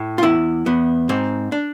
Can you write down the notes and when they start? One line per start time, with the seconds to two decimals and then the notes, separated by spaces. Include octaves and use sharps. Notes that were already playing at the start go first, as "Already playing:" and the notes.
Already playing: A2
0.18 F4
0.23 E2 E4
0.66 E2 B3
1.09 G#2 C4
1.52 D4